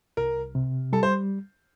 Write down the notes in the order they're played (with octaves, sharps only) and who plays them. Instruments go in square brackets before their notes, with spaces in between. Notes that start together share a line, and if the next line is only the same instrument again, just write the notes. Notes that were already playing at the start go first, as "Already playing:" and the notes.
[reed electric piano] C2 [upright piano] A#4
[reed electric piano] C3
[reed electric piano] G3 [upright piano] A4
[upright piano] C5